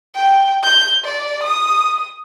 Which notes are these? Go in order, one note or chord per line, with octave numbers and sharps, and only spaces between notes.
G5
G6
D5
D#6